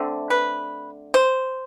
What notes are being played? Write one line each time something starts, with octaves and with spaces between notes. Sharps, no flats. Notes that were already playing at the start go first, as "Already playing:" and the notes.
Already playing: D3 A3 C4
B4
C5